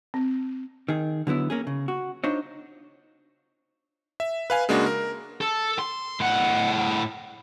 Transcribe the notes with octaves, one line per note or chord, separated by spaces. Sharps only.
C4
D#3 G#4
D3 F#3 B3 E4
A#3 C#4 G#4
C#3
F#4
D4 D#4 F4 C5 C#5
E5
B4 F5 G#5
C#3 G#3 A#3 D4 F#4
A#4
A4
C6
A2 F#5